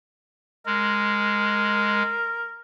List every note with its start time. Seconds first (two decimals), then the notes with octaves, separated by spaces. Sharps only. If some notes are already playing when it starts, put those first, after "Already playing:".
0.66 G#3 A#4